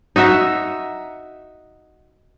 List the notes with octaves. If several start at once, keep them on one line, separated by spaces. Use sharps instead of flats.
D#4 F#4 E5